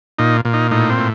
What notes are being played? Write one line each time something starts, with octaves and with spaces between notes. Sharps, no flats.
A#2 D#4
A#2
D#4
A2 D#4
C4
A2